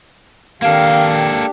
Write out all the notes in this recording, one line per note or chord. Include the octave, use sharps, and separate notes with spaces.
D#3 A#3 D4 G4 A4 F5